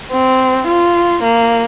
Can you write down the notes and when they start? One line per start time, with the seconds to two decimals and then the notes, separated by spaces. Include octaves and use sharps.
0.12 C4
0.68 F4
1.23 A#3